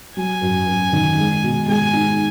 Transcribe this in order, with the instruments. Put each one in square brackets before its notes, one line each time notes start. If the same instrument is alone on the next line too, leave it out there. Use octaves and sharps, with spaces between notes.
[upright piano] F#3 [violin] G#5
[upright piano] F#2
F#2
D#3
G#3
B2
[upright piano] G#3 [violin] G#5
[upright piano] D#4